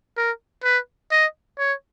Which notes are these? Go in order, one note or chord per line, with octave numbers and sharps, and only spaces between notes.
A#4
B4
D#5
C#5